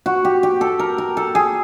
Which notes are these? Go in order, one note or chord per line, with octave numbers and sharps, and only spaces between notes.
F#4
G4
G4
A4
A#4
A#4
A4
G#4